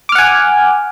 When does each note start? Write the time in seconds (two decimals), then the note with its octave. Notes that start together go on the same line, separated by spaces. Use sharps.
0.09 D6
0.12 F6
0.15 F#5
0.18 G#5